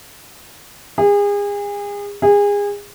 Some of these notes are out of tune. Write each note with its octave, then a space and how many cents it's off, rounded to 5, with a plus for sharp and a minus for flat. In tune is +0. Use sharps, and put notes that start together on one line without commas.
G#4 -35
G#4 -30